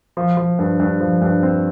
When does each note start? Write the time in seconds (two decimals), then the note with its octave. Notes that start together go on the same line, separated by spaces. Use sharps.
0.17 F3
0.37 F3
0.59 G2
0.80 G2
1.00 F3
1.22 G2
1.43 C4